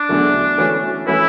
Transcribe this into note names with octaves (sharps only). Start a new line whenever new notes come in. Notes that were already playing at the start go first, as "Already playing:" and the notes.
Already playing: D4
E2 D3 F#3 A3
E3 A3 C#4 F#4 B4
E3 A3 C#4 E4 F#4 B4